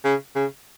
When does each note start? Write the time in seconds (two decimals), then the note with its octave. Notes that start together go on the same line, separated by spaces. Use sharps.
0.05 C#3
0.36 C#3